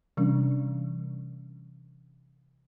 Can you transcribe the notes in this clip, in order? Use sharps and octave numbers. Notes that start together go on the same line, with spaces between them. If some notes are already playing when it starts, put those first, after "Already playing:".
C3 E3 G3 C#4 D4